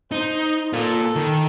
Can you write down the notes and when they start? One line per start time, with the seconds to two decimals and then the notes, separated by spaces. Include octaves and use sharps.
0.12 D#4 C5
0.73 A#3 F4 A4
1.16 D#3